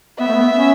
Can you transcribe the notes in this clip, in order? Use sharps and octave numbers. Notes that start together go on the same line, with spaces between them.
B3 E5
A3
B3
C#4